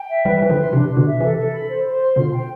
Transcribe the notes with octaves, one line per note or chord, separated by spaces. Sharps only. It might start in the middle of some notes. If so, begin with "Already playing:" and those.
Already playing: G5
E5
E3 G3 B4
E3 B4
D3 F3
C6
C3 E3 D4
D4
B2 D3
E5
C3 E3 A4
A4
B5
C5
C5
C6
B2 D3 F4
G5